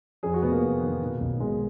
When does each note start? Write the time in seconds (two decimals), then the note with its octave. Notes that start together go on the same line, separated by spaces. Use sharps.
0.23 F2 G#4
0.34 F#4
0.42 F1 B3
0.52 A#3
0.63 F1
0.82 D#3
1.01 B2
1.21 B1
1.40 B2 G#3